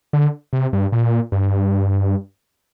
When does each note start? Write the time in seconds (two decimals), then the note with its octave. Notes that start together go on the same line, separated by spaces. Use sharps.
0.13 D3
0.53 C3
0.73 G2
0.92 A#2
1.32 G2